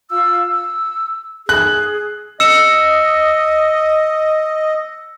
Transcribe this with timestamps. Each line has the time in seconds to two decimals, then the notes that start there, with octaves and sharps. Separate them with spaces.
0.10 F4 F5 E6
0.50 E6
1.49 G#4 F#6
2.40 D#5 E6 C#7 E7